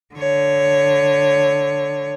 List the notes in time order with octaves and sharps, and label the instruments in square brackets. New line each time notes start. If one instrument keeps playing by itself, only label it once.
[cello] D3 C#5